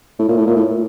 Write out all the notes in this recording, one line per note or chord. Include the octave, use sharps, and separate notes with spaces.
A2
A#2
A2
A#2
A2